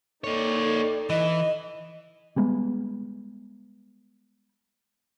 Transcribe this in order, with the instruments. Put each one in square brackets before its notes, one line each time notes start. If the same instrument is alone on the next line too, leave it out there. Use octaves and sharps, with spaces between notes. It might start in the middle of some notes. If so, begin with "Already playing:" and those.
[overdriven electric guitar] A#3 C#5 [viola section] D#4 A4 D5
[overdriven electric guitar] E3 [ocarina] D#5
[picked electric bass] G3 G#3 B3